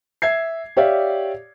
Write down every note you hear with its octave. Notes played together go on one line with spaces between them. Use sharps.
E5 G#6 C7
G4 C#5 D5 E5 F5